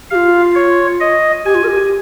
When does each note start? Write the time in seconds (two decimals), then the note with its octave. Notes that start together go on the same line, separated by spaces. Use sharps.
0.10 G4 F5
0.15 F4
0.55 C#5
1.00 D#5
1.45 G4 G#5
1.55 F4
1.64 A#4
1.68 G4